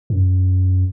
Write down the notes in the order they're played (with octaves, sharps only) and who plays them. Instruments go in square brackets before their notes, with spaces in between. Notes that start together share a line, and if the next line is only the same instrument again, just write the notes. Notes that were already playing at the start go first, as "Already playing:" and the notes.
[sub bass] F#2